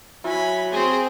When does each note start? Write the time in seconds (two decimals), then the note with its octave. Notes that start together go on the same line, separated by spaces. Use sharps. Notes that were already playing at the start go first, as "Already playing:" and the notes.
0.24 F#3 E4 G#5 B5
0.72 C4 G#4 C5